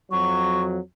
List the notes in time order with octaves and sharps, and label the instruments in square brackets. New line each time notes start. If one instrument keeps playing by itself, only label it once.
[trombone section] F2 F#3 [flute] C#6